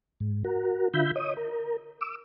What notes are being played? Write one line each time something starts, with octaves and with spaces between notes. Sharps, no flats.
G#2
F#4 A#4
D3 F4 E5 B5 G6
C#5 D#5 D#6
A#4
D6 E6